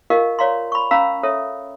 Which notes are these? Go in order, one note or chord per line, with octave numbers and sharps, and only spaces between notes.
F4 G4 A#4 D#5 F5
C#5 D5 F5 A#5 C6
B5 C#6
C#4 F5 A#5 B5 E6
A4 C#5 E5